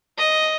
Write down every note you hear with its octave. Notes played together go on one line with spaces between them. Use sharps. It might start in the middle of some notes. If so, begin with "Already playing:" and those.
D#5